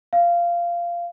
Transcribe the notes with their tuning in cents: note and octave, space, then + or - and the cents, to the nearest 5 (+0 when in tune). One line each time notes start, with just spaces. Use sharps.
F5 -15